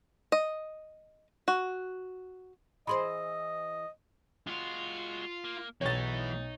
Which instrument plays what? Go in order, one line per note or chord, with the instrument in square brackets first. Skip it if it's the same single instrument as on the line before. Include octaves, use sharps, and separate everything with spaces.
[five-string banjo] D#5
F#4
[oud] E3 G#4 C5 [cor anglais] D#5 [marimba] B5 C6
[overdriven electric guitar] G#3 F#4 [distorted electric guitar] F4
[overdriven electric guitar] A#3
[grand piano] B1 [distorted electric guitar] E3 B3 [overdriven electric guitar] D#4 [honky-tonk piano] C#5 A6